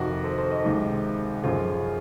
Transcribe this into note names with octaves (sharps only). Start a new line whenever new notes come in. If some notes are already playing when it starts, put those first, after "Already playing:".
Already playing: F2 C3 D#3 F#4 A#4
A4 C5
A4 C5
C5 D#5
C#2 C3 D#3
F#2 C#3 F3 F4 A4